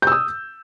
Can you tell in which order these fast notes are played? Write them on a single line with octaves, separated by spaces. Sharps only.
G6 E6 D#6